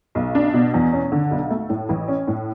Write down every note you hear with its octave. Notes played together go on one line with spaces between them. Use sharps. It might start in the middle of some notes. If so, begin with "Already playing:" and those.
B1
D4
B2
E2
C#4
D3
B1
A3
A2
A1
C#4
A2